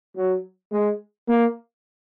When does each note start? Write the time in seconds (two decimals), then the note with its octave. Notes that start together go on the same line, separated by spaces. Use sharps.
0.16 F#3
0.72 G#3
1.28 A#3